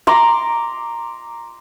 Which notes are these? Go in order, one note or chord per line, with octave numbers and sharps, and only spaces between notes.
A#5 C6 D6